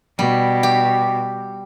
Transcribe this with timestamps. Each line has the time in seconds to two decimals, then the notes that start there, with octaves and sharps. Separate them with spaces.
0.19 B2 G3
0.63 G4